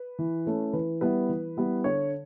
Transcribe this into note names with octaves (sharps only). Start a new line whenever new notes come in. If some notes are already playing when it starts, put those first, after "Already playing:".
Already playing: B4
E3
A3 C#4 E4
E3 B4
G3 B3 E4 B4
E3
G3 B3 E4
D3 C#5